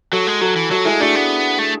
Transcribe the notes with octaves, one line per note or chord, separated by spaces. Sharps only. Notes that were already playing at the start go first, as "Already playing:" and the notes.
F#3 F#4 A4
G#3
F#3 F#4 A4
E3
F#3 F#4 A4
G#3 E4 G#4
A3 D4 F#4
B3
A3